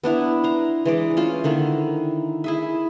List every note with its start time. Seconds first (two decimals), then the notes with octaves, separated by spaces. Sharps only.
0.04 B3 D4 E4 A#5
0.44 C5 A#5
0.85 E3 G#3 D5
1.17 C#4 F4 C5
1.44 D3 D#3 A#3 E4
2.44 E4 G#4 E5